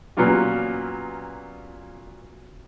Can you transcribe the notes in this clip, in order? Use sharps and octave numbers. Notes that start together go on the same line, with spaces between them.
A#2 F#3 B3 C#4 F4 G4